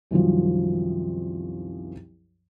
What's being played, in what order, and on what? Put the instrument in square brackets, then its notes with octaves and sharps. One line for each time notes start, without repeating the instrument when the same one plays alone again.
[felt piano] C2 F#2 D#3 F3